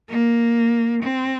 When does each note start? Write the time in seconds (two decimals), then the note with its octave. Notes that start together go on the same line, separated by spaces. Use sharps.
0.09 A#3
1.04 C4